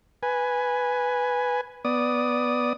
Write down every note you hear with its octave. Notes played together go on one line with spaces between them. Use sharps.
B4 G#5
B3 D5 D#6